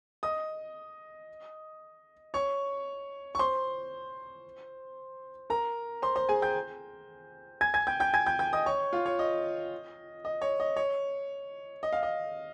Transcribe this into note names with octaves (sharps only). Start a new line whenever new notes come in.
D#5 D#6
C#5 C#6
C#6
C5 C6
A#4 A#5
C5 C6
C5 C6
G#4 G#5
G5 G6
G#5 G#6
G#5 G#6
G5 G6
G5 G6
G#5 G#6
G5 G6
G5 G6
D#5 D#6
C#5 C#6
F4 F5
C#5
D#5
D#5
C#5
D#5
C#5
D#5
F5
D#5